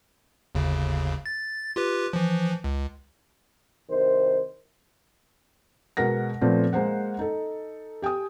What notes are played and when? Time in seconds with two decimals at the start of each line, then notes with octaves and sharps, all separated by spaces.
0.55 G1 D#2 C#3
1.26 A6
1.76 F4 G4 B4
2.13 E3 F3
2.64 C#2
3.89 C2 D#3 C5
5.97 B2 G#3 A#4 F#5 A#6
6.41 A#2 F3 A3 B3 C4
6.73 G#3 A#3 C5 F#5
7.19 D#4 A4
8.02 G4 G5 G#5 D#6